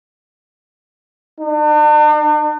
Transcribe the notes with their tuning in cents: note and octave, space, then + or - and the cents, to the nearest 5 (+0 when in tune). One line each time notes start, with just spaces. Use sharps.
D4 +45